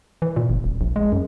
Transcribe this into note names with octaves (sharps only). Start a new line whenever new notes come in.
E3
A#2
G1
D#1
A#1
G#3
F#2